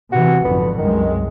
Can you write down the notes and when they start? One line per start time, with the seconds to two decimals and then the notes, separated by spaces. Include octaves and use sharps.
0.12 C3 E3 F#4
0.44 G#1 F2 D3 B3
0.78 C2 F#2 D#3 G#3